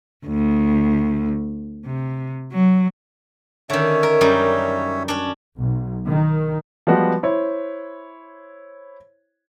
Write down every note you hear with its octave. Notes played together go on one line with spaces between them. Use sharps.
D2
C3
F#3
D3 D#3 C#4 C#5 E5
A#4
F#2 G3 D#4
C#4 D4
B1
D#3
F3 G3 G#3 B3 F#4
E4 C5 C#5